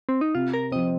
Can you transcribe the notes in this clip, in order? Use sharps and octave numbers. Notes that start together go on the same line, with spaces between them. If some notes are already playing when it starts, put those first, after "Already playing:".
C4
D#4
C3 F4
A#4
F3 C4 D#5